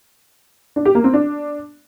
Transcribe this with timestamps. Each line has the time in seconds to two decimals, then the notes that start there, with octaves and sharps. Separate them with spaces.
0.76 D4
0.85 G4
0.95 A#3
1.04 C4
1.14 D4